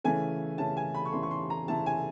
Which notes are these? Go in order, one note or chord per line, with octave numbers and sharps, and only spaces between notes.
C#3 E3 A3 G#5
C#3 E3 A3 A5
G#5
B5
C#6
C#3 E3 A3 C6
C#6
C6
A#5
C#3 E3 A3 A5
G#5